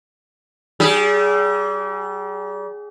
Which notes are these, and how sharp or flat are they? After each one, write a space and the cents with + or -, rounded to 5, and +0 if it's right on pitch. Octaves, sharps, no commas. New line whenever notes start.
G3 -35 G#4 +0